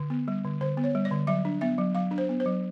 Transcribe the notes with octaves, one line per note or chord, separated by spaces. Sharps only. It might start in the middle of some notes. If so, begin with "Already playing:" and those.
Already playing: D3
B3
G3
D3
D3 C5
B3
C#5
G3
D5
D3
F#3 E5
D4
B3 E5
F#3
F#3 F5
D4
C5
B3
C5
F#3